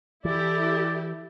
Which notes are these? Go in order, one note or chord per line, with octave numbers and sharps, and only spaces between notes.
E3 E4 G4 A4 D5